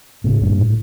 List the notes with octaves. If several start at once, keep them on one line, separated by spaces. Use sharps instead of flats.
A2 C#3
G2 A#2
A2